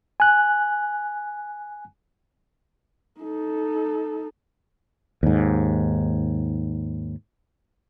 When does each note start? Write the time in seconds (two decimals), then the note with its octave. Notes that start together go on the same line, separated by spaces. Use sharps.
0.20 G#5 F#6
3.21 D#4 A4
5.23 D#2 G#2